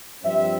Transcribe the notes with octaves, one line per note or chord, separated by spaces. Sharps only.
G2 F3 C4 E5